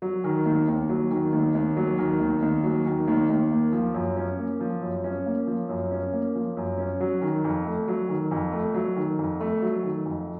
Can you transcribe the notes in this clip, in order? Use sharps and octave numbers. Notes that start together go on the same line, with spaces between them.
F#3
D#3
D#2
D#2
F#3
D#3
D#2
D#2
F#3
D#3
D#2
D#2
F#3
D#3
D#2
D#2
A#3
F3
F#2
C#4
A#3
F3
F#2
C#4
A#3
F3
F#2
C#4
A#3
F3
F#2
C#4
F#3
D#3
F2
A3
F#3
D#3
F2
A3
F#3
D#3
F2
A3
F#3
D#3
F2